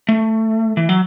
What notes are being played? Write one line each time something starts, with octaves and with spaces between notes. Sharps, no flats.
A3
E3
F#3